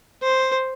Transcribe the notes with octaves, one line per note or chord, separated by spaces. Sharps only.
C5